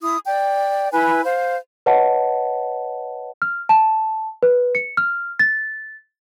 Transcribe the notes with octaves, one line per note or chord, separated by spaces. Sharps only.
E4 D#6
D5 G5
E4 B4 G#5 B5
C5 F5
B4 C#5 D#5 F#5 A5
F6
A5
B4
C#7
F6
A6